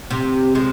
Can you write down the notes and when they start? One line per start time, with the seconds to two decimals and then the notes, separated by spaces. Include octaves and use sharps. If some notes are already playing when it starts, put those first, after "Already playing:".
0.10 C3
0.55 F3 G#3